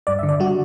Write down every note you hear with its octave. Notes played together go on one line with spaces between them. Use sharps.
G2 D5
E5
D3
D5
G3 F#4